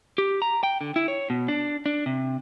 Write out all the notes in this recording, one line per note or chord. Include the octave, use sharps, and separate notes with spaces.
G4
A#5
G5
D3
E4
C#5
B2
D4
D4
C3